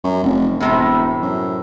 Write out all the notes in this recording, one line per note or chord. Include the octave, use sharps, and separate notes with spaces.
F#2
F1
E1 A2 C3 G3
F#2